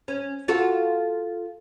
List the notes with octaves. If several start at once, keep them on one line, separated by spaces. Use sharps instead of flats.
C#4
F4 F#4 A4